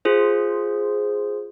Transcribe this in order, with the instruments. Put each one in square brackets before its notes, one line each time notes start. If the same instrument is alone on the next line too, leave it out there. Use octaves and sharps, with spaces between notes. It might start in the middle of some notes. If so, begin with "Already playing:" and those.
[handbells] F4 G#4 C5